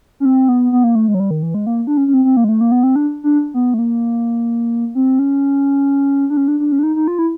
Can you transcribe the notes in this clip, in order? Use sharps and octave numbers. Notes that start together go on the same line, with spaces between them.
C#4
C4
B3
B3
A#3
A3
G#3
F#3
G3
D#3
E3
G#3
A#3
D4
C#4
C#4
C4
C4
A#3
G#3
A3
A#3
B3
C4
D4
D4
B3
A3
A#3
C4
C#4
D4
C#4
D4
D4
C#4
D4
D#4
D#4
F4
E4